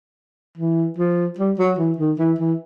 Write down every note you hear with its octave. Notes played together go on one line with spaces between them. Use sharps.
E3
F3
G3
F#3
E3
D#3
E3
E3